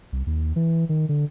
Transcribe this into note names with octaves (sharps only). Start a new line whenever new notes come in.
C2
D#2
E3
D#3
D3